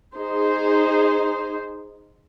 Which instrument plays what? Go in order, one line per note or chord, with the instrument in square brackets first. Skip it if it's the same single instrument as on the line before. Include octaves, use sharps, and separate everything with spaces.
[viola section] D#4 G#4 C5